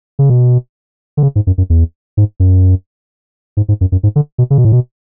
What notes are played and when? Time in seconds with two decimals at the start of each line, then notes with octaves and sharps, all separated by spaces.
0.19 C#3
0.30 B2
1.17 D3
1.23 C#3
1.36 G#2
1.47 F#2
1.58 F#2
1.70 E2
2.17 G#2
2.40 F#2
3.57 G#2
3.69 G#2
3.81 F#2
3.92 F#2
4.03 G#2
4.16 D3
4.38 B2
4.50 C#3
4.58 B2
4.65 A2
4.72 B2